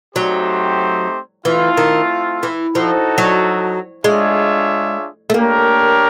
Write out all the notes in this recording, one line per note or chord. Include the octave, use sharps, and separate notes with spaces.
F#3 A3 C4 D#4 G4 C5
E3 A3 C4 F4 A4
D#3
E3
F3 D#4 F#4 A4
F#3
G#3 D4 F4 G#4 C#5 E5
A3
A#3 D4 G4 A#4 C#5